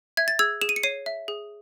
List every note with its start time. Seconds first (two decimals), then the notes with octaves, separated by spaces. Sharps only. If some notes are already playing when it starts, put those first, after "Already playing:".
0.17 E5 G#6
0.28 A6
0.39 G#4 E6 G#6
0.61 G#4 E7
0.69 D#7
0.76 C#7
0.83 C#5 C7 D#7
1.06 E5
1.28 G#4